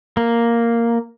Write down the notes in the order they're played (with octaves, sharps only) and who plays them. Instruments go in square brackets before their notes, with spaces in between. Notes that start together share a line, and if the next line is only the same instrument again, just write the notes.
[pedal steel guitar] A#3